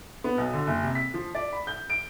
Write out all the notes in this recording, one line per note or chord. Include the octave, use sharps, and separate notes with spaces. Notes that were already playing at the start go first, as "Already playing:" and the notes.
B3
B1
D3
F#1
C3
B6
F3
D5
B5
G6
D7